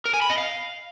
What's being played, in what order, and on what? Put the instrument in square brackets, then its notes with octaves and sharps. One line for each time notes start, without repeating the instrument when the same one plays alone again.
[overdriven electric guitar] A#4
G#5
B5
D#5
F5